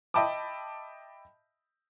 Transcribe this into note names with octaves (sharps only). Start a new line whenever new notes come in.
D#5 E5 G5 A5 B5 D6